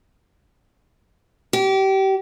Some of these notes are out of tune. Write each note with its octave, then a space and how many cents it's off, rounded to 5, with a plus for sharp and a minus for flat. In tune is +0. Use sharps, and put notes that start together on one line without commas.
G4 -30